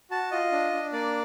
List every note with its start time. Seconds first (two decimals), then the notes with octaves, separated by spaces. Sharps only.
0.11 F#4 A5
0.32 F4 D#5
0.52 D4
0.73 D4
0.92 A#3 D5